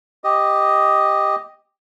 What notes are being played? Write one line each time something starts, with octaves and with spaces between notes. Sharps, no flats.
G4 D#5